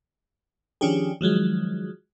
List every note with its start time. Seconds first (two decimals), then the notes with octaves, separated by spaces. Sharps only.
0.81 D#3 F3 C#4 D4 G4 G#4
1.21 D#3 F3 F#3 G#3